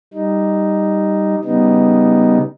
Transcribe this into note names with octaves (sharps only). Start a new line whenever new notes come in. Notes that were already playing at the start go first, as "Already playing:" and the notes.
G3 D#4
C#3 G3 B3 D#4